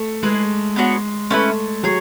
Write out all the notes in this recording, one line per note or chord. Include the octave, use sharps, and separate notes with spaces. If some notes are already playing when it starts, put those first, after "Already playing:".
Already playing: A3
G#3 E4 G#4 B4
B3 D4 F#4 C#5
A3 C#4 E4 B4
F#3 G#4 C#5